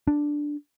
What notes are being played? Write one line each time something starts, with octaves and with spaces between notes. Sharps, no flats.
D4